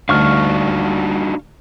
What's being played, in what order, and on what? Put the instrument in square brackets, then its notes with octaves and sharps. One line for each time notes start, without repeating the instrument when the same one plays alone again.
[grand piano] D2 [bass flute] G3 [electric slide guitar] D4 D#4 F#4 [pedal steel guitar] F5 C#6 F6